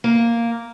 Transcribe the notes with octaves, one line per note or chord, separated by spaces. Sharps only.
A#3